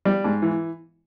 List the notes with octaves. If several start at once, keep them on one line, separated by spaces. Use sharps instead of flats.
G3
G#2
E3